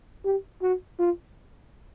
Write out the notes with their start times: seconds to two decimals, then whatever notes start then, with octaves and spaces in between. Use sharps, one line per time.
0.25 G4
0.62 F#4
0.99 F4